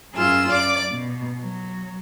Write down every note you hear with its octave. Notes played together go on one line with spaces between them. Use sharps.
F#2 F4 G#4 E6
F#2 D5 D6
B2
F#3